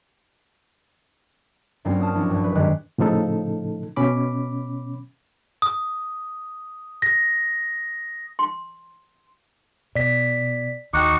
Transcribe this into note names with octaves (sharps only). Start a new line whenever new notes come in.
G2 F#3 A#3 C4 C#4 F4
A5 D#6 F6
F3 F#3 C#4 D4 E4
A#1 G2
B4
G2 D#3 G#3 G4 F#6
A2 C#3 F3 D#4 A4
B2 C#4 B5 D6
D#6
A#6
C6
B2 D5 B6
D#2 D#4 F#4 G5 C#6 D6